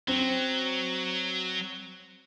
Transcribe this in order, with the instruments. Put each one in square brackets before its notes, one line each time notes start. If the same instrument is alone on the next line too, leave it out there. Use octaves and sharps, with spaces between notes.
[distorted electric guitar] F#3 [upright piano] C4